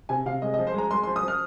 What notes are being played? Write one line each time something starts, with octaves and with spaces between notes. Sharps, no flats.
C3 G#5
C3 F5
G#3 D#5
D#5
F3
C5
G#3 A#5
G#3 C6
C6
F3
D#6
F3
F6